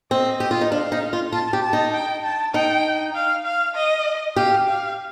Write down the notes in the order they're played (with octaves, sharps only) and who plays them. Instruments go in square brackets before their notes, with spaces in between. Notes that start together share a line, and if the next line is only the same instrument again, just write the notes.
[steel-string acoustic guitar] C4 [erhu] D#5
[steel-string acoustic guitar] G4
F4
D#4
[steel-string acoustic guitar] D4 [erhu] F5
[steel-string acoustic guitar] D#4
F4
[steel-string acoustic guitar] F4 [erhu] A5
[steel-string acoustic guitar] G4
[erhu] A5
[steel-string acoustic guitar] D#4
[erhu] G5
A5
[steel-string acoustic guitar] D#4 [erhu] G5
[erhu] F5
F5
D#5
[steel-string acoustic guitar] G4 [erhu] F5
[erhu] F5